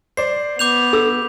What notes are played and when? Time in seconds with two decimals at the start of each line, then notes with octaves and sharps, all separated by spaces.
0.17 C5 D5 C7
0.59 B3 D6 G6 F7
0.93 A4 E6